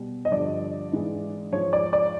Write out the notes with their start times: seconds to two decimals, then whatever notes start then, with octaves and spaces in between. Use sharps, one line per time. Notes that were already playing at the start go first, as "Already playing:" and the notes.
Already playing: B2 G3
0.25 D#5
0.32 G2 D3 F3 D5
0.92 G#2 E3 G#3
1.52 G#2 F3 G#3 C#5
1.73 D5
1.93 D5